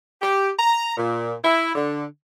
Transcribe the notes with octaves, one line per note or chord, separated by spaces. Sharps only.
G4
A#5
A#2
E4
D3